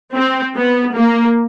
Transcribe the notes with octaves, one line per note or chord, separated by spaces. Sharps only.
C4
B3
A#3